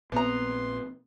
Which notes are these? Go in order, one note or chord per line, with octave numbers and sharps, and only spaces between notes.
A#1 B3 C4 A#5 C6